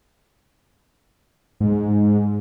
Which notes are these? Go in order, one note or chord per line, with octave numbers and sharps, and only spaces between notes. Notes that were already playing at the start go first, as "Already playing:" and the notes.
G#2